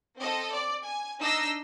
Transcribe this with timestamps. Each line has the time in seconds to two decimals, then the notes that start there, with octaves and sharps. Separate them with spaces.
0.17 C4 A4 D#5
0.51 D5
0.83 G#5
1.19 D4 D#4 D#5 E6 A#6 C7